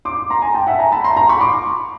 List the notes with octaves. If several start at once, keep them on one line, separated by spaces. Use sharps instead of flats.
C6 D6
A#5 C6
G#5 A#5
G5 A5
E5 F#5
G#5 A#5
A5 B5
A#5 C6
A#5 C6
B5 C#6
C6 D6